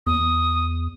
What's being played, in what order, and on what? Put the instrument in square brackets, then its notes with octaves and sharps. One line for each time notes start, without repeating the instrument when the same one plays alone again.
[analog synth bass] E2 [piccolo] D#6